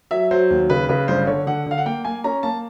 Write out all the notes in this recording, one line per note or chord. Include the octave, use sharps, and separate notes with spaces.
F#3 E5
F#3 C5
D#2
C#3 B4
C#3 B4
G1 C5
D3 C#5
D3 F#5
D3 F5
F#5
A#3 G5
A#3 G#5
C#4 A#5
A#3 A5